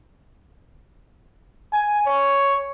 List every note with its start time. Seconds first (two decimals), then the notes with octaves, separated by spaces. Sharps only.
1.73 G#5
2.07 C#5